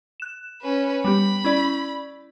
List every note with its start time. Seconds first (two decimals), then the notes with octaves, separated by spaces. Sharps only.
0.20 F#6 E7
0.62 C#4 B4
1.04 G3 B3 G4 B5
1.44 C#4 E4 D5